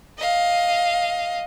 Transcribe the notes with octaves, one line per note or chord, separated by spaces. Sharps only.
D#5 F5